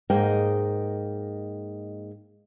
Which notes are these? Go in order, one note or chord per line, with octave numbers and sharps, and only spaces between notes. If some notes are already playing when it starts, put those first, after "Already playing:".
G#2 A#3 G#4 D#5 G5